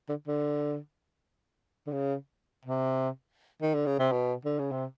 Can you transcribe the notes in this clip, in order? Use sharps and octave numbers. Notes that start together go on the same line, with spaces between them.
D3
D3
D3
C#3
C3
D#3
D3
C#3
C3
B2
D3
C#3
C3